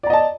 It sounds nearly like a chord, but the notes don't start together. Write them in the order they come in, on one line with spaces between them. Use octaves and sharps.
D5 A#5 D#5 A5